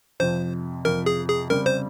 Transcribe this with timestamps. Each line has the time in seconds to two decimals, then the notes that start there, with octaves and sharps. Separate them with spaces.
0.20 F2 C3 F3 C5
0.85 F2 C3 F3 A#4
1.06 G#4
1.28 G#4
1.50 C#3 G3 C4 A#4
1.66 C5